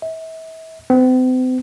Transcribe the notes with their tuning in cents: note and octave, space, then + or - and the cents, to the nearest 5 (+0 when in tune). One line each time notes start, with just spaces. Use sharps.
E5 -35
C4 -40